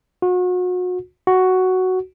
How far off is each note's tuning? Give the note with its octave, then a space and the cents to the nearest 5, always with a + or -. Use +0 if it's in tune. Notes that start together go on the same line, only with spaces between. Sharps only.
F#4 -35
F#4 +5